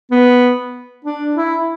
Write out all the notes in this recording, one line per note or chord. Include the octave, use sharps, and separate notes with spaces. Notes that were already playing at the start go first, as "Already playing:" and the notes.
B3
D4
E4